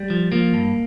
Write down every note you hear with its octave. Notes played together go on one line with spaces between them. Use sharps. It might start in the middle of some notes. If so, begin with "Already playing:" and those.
Already playing: G3
F3
F3 A#3
G2